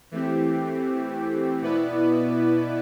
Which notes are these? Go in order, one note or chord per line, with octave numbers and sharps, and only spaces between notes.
E3 A3 C4 G4
B2 B3 E4 B4 D5